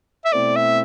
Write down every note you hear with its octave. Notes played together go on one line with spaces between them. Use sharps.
E5
B2 A3 C4 E4 D5
E5